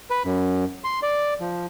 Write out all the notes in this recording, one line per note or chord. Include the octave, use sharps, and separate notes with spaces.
B4
F#2
C6
D5
F3